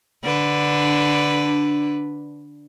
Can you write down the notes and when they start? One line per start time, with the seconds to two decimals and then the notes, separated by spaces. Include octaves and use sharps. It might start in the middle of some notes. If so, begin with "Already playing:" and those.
0.24 D3 D4 B4